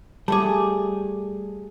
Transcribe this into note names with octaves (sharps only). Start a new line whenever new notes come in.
G3 A3 G#4 A5 D6